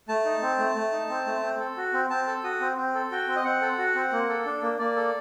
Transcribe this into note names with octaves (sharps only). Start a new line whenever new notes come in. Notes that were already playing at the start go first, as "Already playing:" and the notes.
A3 A5
D#4
C4
A3
A3
D#4
C4
A3
C4
A4
F#4
C4
C4 A5
A4
F#4 D#6
C4
C4
A4
F#4 G5
C4
D#5
C4 F#5
A4
F#4
C4
A#3
A4
D4
A#3
A#3 D5
A4